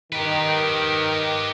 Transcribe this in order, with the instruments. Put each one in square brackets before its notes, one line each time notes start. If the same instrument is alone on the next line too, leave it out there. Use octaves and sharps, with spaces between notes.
[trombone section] D#3 [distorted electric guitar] G4 B4